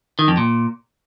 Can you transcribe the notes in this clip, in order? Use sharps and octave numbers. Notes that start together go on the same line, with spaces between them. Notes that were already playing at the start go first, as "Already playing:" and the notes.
D#3
F2
A#2